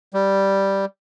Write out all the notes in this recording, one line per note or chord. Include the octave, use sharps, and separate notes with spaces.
G3